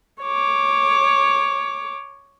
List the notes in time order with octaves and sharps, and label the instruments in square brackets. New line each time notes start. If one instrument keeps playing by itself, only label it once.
[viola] C#5 D6